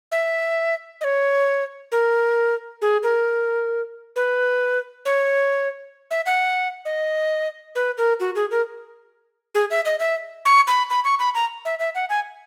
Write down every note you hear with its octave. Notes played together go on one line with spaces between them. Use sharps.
E5
D#5
C#5
A#4
G#4
A#4
B4
C#5
E5
F#5
D#5
B4
A#4
F#4
G#4
A#4
G#4
E5
D#5
E5
C#6
B5
B5
C#6
B5
A#5
E5
E5
F#5
G#5